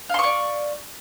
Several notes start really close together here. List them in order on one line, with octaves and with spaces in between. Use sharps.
F5 C6 C#6 D5